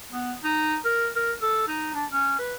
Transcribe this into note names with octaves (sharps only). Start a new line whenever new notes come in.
B3
D#4
A#4
A#4
A4
D#4
D4
C#4
B4